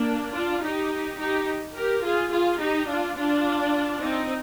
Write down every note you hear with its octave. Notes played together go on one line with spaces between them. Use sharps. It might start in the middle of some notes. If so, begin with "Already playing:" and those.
Already playing: A#3 D4
D4 F4
D#4 G4
D#4 G4
G4 A#4
F4 G#4
F4 G#4
D#4 G4
D4 F4
D4 F4
C4 D#4